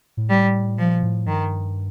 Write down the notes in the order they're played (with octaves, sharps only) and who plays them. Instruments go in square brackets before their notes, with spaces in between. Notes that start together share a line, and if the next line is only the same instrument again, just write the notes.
[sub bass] A2
[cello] G3
[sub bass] A#2 [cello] F3
[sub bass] A2
[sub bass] G2 [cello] D#3